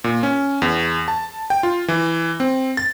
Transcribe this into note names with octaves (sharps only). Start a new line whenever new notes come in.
A#2
C#4
E2
A5
G5
F4
E3
C4
A6